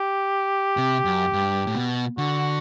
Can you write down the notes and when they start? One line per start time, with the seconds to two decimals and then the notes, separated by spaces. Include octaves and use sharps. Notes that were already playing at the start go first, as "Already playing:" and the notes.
Already playing: G4
0.77 C3
1.05 F#2
1.33 G2
1.67 A2
1.75 B2
2.18 D3 F#4